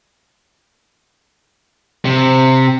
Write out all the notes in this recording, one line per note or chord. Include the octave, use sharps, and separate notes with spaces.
C3